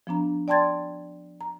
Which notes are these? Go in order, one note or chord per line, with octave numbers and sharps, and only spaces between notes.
F3 B3 D4 A#5
D5 G5 A5 C6 G#6 A6
A#5